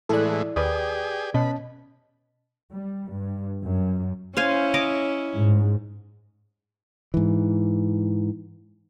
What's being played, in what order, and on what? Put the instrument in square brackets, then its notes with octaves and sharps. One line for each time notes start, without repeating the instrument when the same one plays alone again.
[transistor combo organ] A2 E3 G#3 [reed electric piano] E4 D5 [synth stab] A4 F#6
[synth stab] D#2 [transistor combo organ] G4 G#4 [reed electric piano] B4 D5 D#6
[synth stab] B2 [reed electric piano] C#4 D#5 A5 [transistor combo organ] B4
[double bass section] G3
G2
F#2
[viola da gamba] C#4 E4 [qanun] C5 F5 G#5
[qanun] C#5 D#5 D6
[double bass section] G#2
[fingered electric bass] G#2 E3